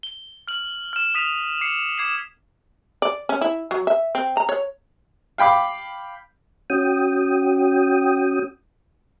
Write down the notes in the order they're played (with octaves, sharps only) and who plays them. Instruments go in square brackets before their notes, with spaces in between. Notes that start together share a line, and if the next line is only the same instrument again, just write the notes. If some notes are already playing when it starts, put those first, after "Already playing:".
[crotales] G7
F6 F#7
F6 E7
D#6 F6 B6 D#7 F7
D6 C7 C#7
D6 G#6 C7 E7
[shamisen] D5
C#4
E4
F#3
E5
C4
A#5
C#5
[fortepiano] F5 G5 B5 D6
[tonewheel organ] C#4 F#4 G5 D#6